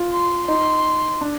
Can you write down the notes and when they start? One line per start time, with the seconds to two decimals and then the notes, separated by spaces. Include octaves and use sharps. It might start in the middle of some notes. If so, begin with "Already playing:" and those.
Already playing: F4
0.12 C6
0.48 D#4 C6
1.21 D4